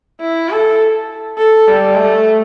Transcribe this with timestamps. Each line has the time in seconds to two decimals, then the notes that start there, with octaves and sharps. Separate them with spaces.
0.21 E4
0.50 A4
1.38 A4
1.68 G3
1.97 A3